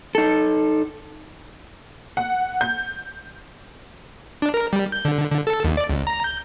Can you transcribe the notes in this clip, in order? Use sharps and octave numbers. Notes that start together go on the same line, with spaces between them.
D#4 A4
F#5
G6
D4
A#4
G3
G6
D3
D3
A4
D#2
D5
C#2
A#5
G6